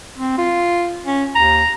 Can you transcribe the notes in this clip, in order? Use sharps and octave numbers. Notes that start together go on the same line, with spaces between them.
C4
F4
C#4
D#2 A#5